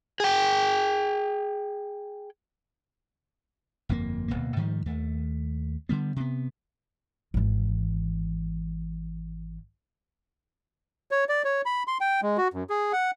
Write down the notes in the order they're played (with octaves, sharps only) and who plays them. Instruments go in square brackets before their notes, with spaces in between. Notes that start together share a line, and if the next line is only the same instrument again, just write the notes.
[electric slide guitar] G#4 G5
[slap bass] G1 F2 E3 A#3
D1 A#1 B2 A#3
G#2 D#3 F3 G3
D#2 A3
D3 G3 B3
C3 B3
[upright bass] G#1 E3
[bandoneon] C#5
D5
C#5
B5
C6
G5
G#3
F#4
F#2
G#4
F#5